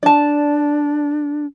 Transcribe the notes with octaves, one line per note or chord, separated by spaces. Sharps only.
D4 D5 A5